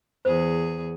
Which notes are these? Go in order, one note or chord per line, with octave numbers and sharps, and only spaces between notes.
E2 G#4 C5